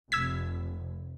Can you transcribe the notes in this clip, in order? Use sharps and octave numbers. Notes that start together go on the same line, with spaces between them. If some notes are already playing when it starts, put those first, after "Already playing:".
F1 E6 G#6 B6